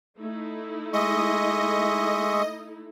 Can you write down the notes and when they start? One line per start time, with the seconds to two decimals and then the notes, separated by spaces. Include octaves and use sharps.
0.19 A3 D#4 E4
0.93 G#3 D#5 E5 C#6